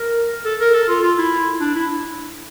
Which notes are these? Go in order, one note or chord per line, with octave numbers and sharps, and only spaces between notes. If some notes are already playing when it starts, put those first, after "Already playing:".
Already playing: A#4
A4
A#4
A4
F4
F4
E4
D4
E4